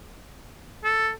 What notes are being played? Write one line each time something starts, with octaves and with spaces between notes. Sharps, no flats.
A4